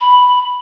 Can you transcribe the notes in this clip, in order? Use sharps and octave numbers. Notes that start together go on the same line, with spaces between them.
B5